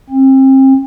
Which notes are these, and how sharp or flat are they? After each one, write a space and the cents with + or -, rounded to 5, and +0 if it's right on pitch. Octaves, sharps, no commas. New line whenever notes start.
C4 +35